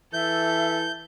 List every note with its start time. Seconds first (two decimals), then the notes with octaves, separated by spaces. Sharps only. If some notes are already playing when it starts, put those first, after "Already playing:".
0.13 E3 A4 E5 G6